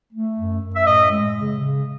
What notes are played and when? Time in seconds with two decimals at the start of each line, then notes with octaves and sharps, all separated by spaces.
0.13 A3
0.38 F#2
0.62 F#2
0.75 E5
0.87 A2 D#5
1.11 G#3
1.35 C#3
1.60 C#3